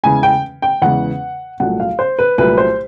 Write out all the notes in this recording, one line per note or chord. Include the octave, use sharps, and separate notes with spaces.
E2 C#3 E3 G#3 G#5
G5
G5
E2 C#3 E3 G#3 F#5
C2 A#2 F#3 A3 F#5
F5
C5
B4
C2 A#2 F#3 A3 B4
C5